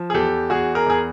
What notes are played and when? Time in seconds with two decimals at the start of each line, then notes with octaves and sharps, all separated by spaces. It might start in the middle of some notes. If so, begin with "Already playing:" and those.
Already playing: F3
0.10 G#4
0.14 E2 G4 A4
0.50 E2 F#4 G#4
0.75 G#4 A#4
0.86 E2 G#4